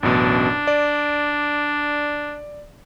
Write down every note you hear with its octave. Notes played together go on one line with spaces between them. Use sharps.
A1 F#2 B2 D4
D5